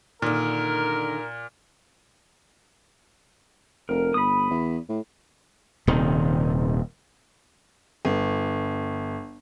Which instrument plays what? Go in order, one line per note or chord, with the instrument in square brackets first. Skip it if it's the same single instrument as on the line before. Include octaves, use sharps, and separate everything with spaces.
[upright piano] A#2 [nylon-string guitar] D3 D#3 [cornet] A#4
[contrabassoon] F1 [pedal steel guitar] A#4
[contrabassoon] G1 [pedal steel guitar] B5 D#6
[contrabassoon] E2
A2
[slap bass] D#1 C3 D#3
[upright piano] G1